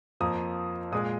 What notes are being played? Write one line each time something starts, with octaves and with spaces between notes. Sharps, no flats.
F2 F3 A#3 D#6
A#2 G#3 D#6